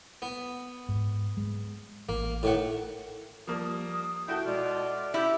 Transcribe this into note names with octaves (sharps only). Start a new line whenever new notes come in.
B3
G#2
G#3
A1 A#3
A2 D#3 F#5
F3 G3 A#3 D#6
E4 F#4 A4 G5
B2 G#3 F4 D5
E4 G4